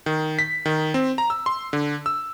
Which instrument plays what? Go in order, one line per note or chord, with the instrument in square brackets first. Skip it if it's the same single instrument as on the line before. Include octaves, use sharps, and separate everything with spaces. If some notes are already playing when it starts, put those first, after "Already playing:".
[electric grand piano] D#3
B6
D#3
C4
A#5
E6
C6
D3
E6